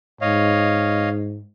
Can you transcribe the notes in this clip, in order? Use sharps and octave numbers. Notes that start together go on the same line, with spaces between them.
G#2 C#5 D#5 F5